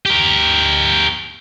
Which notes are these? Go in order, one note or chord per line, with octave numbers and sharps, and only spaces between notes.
G4 A#4